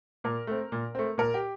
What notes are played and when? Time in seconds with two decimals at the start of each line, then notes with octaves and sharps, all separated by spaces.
0.24 A#2 A#4
0.47 A3 C4
0.72 A#2
0.95 A3 C4
1.18 A#2 A#4
1.34 G4